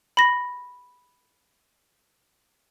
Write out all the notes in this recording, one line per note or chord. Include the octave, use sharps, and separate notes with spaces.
B5 A#6